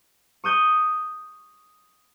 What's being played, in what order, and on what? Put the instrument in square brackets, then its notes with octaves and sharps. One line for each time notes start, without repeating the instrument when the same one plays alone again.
[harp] C#6 D#6 G6 D#7